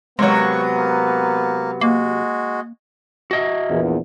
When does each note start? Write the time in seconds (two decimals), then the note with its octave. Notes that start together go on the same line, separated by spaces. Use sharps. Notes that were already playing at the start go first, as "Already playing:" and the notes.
0.19 C3 F#3 G#3 A#3 B3 C#6
0.77 A#3
1.81 G#3 A#3 F#4
3.31 F#4 D#5 E5
3.69 A#1 E2